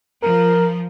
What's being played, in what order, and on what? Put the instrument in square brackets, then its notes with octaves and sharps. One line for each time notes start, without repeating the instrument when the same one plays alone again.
[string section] F3 [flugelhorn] A#4